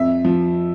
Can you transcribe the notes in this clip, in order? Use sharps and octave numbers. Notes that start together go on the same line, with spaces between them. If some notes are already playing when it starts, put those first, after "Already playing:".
Already playing: F2 E5
F3